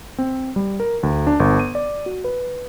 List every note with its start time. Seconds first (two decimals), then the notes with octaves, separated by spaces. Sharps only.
0.18 C4
0.56 G3
0.80 A#4
1.03 D2
1.27 D4
1.40 G1
1.59 D#7
1.75 D5
2.06 F#4
2.24 B4